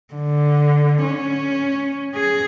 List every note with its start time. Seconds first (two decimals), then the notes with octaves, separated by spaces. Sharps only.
0.14 D3
1.03 C#4
2.15 G#4